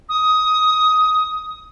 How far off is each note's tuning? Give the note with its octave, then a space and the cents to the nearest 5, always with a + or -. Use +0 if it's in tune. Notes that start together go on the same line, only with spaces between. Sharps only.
D#6 +15